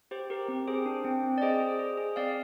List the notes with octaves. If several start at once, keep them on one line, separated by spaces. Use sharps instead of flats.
G4 C5
G4 A#4
C4
G#4 C5
D4
C4
C4
D5
G#4 C5 D#5
G#4
G#4
G#4
C4 D5 F5